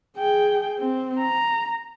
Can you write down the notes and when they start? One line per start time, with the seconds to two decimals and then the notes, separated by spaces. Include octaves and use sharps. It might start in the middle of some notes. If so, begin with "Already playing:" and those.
0.18 G#4 G5
0.80 C4
1.19 A#5